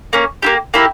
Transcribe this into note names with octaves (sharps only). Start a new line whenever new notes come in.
A#3 C#4
A#3 E4 G4
A#3 E4 G4